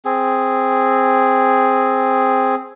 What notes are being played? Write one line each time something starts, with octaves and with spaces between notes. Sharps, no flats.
C4 G#4